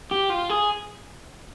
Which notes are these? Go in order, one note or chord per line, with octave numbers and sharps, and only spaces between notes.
G4
F4
G#4